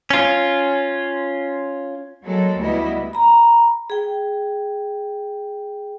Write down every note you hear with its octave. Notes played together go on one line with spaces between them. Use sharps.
C#4 F4
F#3 G#3 A#3 A4
D2 G3 B3 E4 D#5
A#5 B5
G#4 G5